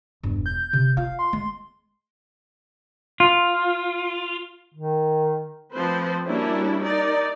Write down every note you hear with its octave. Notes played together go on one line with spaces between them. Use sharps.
E1 G2
G6
C3
F4 F5
C6
G#3
F4
D#3
F3 A3 C4 B4 C5
G3 A#3 C#4 D4 E4 F#4
D#4 A#4 D5